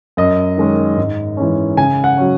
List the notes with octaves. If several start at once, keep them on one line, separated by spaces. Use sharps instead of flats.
F#2 D#5
D#3 G#3 C#4
G#2
E3 G#3 C#4
C#3 G#5
F#5
F#3 C#4